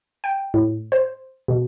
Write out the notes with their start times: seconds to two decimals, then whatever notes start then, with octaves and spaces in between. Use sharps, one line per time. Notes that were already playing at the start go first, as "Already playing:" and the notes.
0.24 G5
0.54 A2
0.92 C5
1.48 B2